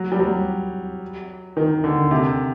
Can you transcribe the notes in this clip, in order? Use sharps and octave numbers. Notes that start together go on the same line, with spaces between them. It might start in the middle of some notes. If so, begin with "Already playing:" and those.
Already playing: F#3
G3
F#3
D#3
D3
C3